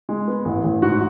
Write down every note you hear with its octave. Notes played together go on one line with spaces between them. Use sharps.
G#3
B3
A1
A1
G#2 F#4